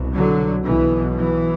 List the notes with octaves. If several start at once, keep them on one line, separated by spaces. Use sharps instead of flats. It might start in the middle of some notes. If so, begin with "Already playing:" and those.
Already playing: C2 B2
D3 F#3
B1 B2 E3
E3